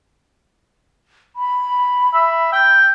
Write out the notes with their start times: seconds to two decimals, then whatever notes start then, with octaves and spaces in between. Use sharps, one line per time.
1.36 B5
2.14 E5
2.53 G5